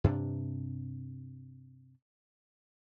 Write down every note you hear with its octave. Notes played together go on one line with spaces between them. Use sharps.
G2 C3 D4